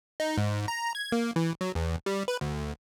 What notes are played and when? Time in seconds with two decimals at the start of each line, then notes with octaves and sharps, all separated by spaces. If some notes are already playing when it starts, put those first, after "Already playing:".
0.20 D#4
0.38 G#2
0.68 A#5
0.95 G#6
1.12 A#3
1.36 E3
1.61 F#3
1.75 E2
2.06 G3
2.28 B4
2.41 D2